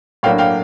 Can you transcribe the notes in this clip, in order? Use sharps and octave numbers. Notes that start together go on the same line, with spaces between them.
A2 F#3 A#3 D4 F5 G5
F5 G5